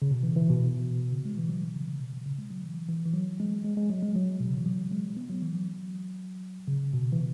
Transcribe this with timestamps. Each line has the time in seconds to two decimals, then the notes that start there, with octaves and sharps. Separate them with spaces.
0.02 C#3
0.11 B2
0.23 E3
0.36 E3
0.49 B2
1.12 C#3
1.25 G#3
1.38 E3
1.49 F#3
1.62 E3
1.75 C#3
1.87 C#3
2.00 B2
2.13 B2
2.26 C#3
2.38 G#3
2.50 F#3
2.64 E3
2.89 E3
3.06 E3
3.14 F#3
3.40 G#3
3.64 G#3
3.77 G#3
3.90 F#3
4.03 G#3
4.16 F#3
4.40 B2
4.49 C#3
4.58 E3
4.66 F#3
4.91 G#3
5.17 B3
5.30 F#3
5.42 E3
5.55 F#3
6.67 C#3
6.94 B2
7.12 E3